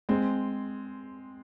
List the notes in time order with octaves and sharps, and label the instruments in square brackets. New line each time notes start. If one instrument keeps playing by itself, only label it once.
[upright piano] G#3 C4